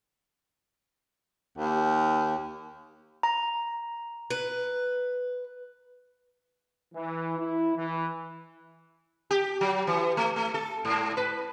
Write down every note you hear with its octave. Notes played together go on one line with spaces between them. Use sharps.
D#2
A#5
B4
E3
E4
E3
G4
F#3
E3
A3
A3
A4
G#2
B4